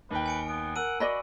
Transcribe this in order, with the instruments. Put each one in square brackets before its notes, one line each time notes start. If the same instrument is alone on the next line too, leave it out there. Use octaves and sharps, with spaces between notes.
[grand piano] D#2 G5 [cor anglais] B4
[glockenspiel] G#5 C#7 D7
[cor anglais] B3 [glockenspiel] D7
[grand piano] A#4 [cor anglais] F#5 [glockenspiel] E6 D7 D#7
[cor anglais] F#4 [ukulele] D5 D#5 B5